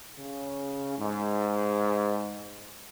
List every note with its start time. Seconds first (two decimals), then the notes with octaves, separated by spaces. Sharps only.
0.18 C#3
0.98 G#2